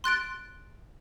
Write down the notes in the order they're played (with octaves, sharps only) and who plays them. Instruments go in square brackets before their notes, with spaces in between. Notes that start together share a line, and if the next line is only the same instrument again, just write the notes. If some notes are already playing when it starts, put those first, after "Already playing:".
[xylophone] C6 F#6 A6 D7